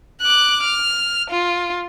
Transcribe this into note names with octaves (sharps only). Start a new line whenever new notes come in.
D6 F#6
F6
F4